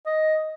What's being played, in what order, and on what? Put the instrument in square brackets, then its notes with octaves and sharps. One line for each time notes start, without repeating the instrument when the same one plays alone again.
[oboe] D#5